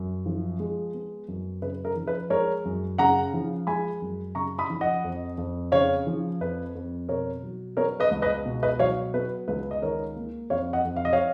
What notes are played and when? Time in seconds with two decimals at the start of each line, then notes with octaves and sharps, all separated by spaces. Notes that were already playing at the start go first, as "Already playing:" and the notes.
Already playing: F#2
0.26 F3
0.60 G#3
0.94 B3
1.28 F#2
1.62 C#3 B4
1.85 A#4
1.96 F3
2.07 B4
2.30 G#3 A#4 C#5
2.65 F#2
2.98 C#3 F#5 A#5
3.34 F3
3.67 G#3 G#5 B5
4.02 F#2
4.35 C#3 A#5 C#6
4.59 B5 D#6
4.70 F3
4.81 D#5 F#5
5.04 F2
5.38 F2
5.72 C#3 C#5 F5
6.07 F3
6.41 F2 B4
6.75 F2
7.09 B2 A#4 C#5
7.43 F#3
7.77 B3 A#4 C#5
8.00 B4 D#5
8.11 C#2
8.22 B4 D#5
8.45 B2
8.63 B4 D#5
8.79 F#3 C#5 F5
9.14 B3 B4
9.48 C#2 B4
9.71 D#5
9.82 D#3 A#4 C#5
10.16 A#3
10.50 F2 C#5 F5
10.73 D#5 F#5
10.85 F2
10.96 F5
11.05 D#5
11.13 C#5 F5